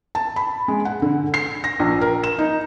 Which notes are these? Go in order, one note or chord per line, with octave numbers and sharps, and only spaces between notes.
A5
B5
G#3
F#5
D3
C7
A#6
A#1
A#4
E7
D#4